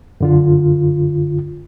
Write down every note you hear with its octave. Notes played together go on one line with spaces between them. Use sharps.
F#2 D3 F4